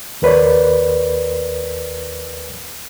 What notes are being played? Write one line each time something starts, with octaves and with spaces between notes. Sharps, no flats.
D#2 A#4 B4 C#5 D5